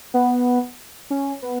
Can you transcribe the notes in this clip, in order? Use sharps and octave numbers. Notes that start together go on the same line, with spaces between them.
B3
C#4
B3